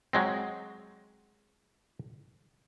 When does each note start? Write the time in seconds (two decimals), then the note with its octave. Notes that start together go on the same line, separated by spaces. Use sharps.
0.13 F#3 G#3 C4